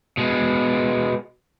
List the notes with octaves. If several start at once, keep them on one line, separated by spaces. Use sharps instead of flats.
B2 G#3